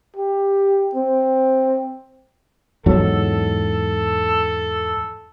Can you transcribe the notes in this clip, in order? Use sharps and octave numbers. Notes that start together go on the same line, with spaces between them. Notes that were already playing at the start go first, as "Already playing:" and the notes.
G4
C4
E2 G#2 F#3 A4